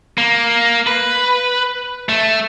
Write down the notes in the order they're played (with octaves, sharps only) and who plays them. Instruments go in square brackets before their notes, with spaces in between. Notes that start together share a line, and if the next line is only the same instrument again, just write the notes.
[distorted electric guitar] A#3
B4
A3